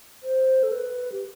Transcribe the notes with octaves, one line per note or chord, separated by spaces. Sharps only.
C5
A4
B4
G4